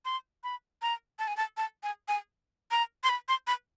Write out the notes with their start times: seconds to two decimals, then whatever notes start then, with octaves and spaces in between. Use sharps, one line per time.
0.05 C6
0.44 B5
0.82 A#5
1.19 A5
1.27 G#5
1.37 A5
1.57 A5
1.83 G#5
2.08 G#5
2.71 A#5
3.04 C6
3.09 B5
3.28 C6
3.47 B5